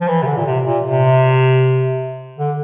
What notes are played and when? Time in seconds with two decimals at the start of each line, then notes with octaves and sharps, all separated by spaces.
0.01 F3
0.08 E3
0.23 C3
0.27 D3
0.37 A#2
0.46 C3
0.65 A#2
0.84 C3
2.38 D3